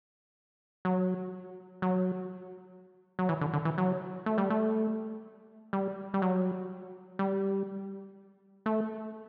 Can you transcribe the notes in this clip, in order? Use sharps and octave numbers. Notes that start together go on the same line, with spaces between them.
F#3
F#3
F#3
E3
D3
D3
E3
F#3
A3
G3
A3
G3
G3
F#3
G3
A3